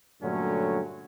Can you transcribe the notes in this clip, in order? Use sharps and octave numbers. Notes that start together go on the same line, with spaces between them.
G2 A#2 D3 F#3 A3 C#4